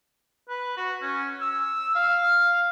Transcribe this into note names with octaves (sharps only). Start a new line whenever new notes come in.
B4
F#4
C#4
E6
F5